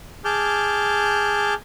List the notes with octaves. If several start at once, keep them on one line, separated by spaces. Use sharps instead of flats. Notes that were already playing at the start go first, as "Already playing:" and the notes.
G#4 A5 D6 F6 G6